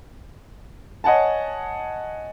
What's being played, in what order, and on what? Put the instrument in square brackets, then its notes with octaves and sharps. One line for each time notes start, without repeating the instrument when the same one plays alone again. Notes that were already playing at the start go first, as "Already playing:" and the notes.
[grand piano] C#5 D#5 F#5 G#5 A5